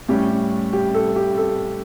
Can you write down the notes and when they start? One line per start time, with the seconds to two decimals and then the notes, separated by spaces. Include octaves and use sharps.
0.09 A2 G3 C#4 G4
0.73 G4
0.95 A4
1.16 G4
1.38 A4